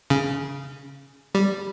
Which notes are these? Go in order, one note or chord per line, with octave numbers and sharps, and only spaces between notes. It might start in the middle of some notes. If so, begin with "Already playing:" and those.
C#3
G3